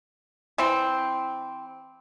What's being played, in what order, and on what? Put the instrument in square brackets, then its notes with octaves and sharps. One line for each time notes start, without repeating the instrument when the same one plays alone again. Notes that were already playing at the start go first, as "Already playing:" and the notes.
[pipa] E3 C4